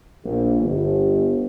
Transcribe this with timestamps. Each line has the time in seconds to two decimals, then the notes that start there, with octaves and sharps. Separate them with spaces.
0.24 A#1
0.62 G1